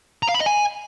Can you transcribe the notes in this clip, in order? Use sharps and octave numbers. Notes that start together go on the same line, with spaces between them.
A#5
F5
B5
D#5
G#5